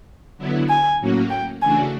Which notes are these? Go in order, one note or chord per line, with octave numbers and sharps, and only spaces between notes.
D3 F#3 B3 E4
G#5
A2 F#3 A#3 C#4 F#4
G5
C#3 E3 A3 D4 F#4 G#5